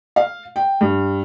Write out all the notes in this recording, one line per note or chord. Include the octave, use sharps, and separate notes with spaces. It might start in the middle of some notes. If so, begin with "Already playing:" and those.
F5
G5
G2